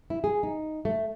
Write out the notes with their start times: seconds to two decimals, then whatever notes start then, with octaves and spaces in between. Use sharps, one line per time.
0.10 E4
0.24 G#4
0.43 D#4
0.85 A3